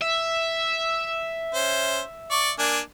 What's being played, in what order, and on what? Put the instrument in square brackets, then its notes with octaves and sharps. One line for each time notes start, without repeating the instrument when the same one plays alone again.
[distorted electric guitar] E5
[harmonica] C#4 C5
D5 C#6
A#3 D4 G#5